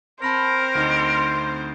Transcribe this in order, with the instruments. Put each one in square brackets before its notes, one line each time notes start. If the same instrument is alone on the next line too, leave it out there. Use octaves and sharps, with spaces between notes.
[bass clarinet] C4 [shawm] A#4 [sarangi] C5 [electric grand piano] A5 B5 A#6
[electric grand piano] D2 D#4